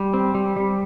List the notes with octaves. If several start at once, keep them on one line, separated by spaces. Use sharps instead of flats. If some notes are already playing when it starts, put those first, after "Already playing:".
Already playing: G3 G5
C4
G3
G3